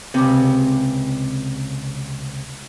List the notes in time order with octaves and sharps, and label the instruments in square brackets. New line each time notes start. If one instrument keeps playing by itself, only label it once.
[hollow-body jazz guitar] C#2 C3